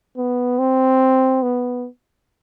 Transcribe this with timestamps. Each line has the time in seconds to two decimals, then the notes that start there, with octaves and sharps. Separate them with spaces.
0.17 B3
0.59 C4
1.43 B3